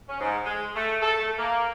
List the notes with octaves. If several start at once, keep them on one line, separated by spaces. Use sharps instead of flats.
C#4
G#2
G#3
A3
A4
A3
A#3